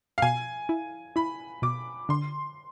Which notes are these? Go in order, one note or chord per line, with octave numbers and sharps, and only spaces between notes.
F5
B2 G#5
E4
E4 B5
B2 D6
D3 C6